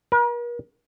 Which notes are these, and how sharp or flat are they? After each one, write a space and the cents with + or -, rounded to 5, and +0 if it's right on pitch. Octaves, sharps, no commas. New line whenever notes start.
A#4 +45